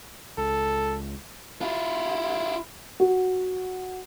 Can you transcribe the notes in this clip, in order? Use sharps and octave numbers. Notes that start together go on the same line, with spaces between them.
C#2 A4
E4 F4
F#4